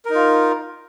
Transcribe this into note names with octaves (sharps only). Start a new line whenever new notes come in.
D#4 F4 A#4